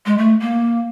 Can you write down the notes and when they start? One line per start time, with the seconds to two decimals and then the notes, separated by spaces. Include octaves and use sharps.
0.06 G#3
0.18 A3
0.41 A#3